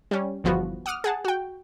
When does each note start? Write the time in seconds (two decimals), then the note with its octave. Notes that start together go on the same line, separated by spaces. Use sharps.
0.11 G3 C#4
0.44 G1 E2 F3 B3 F#4
0.86 F#5 D6 D#6 F6
1.04 G#4 F#5 A5
1.25 F#4 G5